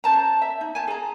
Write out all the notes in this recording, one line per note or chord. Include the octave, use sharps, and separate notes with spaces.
C#4 C5 A5 A#5
E5
D#4
G#5 A5
G#4 A#5